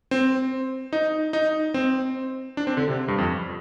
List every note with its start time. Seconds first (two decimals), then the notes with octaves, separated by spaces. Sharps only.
0.11 C4
0.93 D#4
1.33 D#4
1.74 C4
2.57 D4
2.67 C4
2.77 D3
2.88 C3
3.08 G2
3.18 F2